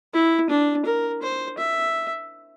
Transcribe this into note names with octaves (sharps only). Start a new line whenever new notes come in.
E4
D4
A#4
C5
E5